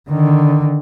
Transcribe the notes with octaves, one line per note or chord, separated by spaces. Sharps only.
D3 D#3